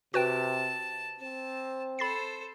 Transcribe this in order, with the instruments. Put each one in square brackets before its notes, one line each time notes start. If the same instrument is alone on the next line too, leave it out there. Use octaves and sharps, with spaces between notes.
[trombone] C3 [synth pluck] F#4 B4 G5 [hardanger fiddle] A5
[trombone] C4 [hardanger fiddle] A5
[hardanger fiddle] A4 C5 [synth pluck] B5 A6 C7